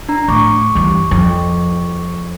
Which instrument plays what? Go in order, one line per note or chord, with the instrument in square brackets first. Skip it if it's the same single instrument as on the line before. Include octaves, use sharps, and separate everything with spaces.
[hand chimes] D4 A#5
[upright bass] A2 [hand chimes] C#6 D6
[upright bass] G2 E3
F2